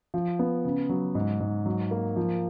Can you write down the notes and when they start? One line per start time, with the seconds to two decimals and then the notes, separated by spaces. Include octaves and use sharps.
0.14 F3
0.39 B3
0.65 C#3
0.89 F#3
1.15 G#2
1.40 G#2
1.66 F#3
1.91 A#3
2.16 F3